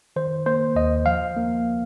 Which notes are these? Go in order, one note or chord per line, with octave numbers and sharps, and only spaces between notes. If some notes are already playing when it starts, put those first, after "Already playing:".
D#3 C5
A#3 C5
D#2 D#5
F3 F5
A#3